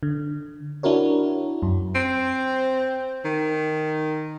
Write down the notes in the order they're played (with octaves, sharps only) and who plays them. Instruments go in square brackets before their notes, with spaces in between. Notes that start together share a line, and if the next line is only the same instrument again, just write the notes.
[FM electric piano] D3
D4 E4 F#4 A#4 C#5
F#2
[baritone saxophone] C4
D#3